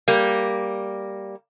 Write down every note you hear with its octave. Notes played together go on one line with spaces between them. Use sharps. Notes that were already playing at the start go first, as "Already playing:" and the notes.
G3 A#3